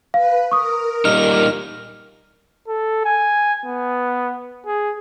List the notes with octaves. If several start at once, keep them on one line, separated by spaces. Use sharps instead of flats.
B4 F5
A#4 C#6 D#6
A#2 G3 D#4 F6
A4
G#5
B3
G#4